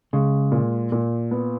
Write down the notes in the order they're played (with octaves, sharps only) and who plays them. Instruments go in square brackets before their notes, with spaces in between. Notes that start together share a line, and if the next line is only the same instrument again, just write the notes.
[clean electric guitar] C#3 [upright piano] G#3
[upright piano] A#2
A#2
B3